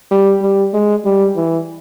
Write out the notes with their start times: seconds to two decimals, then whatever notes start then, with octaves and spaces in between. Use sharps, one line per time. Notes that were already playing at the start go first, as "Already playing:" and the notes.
0.11 G3
0.42 G3
0.74 G#3
1.05 G3
1.36 E3